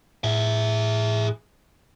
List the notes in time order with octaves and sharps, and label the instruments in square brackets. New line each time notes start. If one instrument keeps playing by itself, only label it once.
[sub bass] A2 [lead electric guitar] G#4 E5